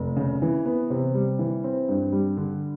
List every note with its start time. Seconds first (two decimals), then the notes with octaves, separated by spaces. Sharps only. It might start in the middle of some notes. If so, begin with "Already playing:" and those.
Already playing: F1
0.16 C#3
0.42 E3
0.65 B3
0.90 C3
1.14 G3
1.39 E3
1.64 C4
1.89 G2
2.12 G3
2.37 D3